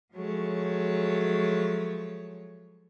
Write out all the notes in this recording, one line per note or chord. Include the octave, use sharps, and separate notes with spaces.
F3 F#3 G#3 A3 C#5